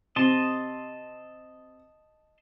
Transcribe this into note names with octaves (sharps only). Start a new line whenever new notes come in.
C3 D#5 A5 C6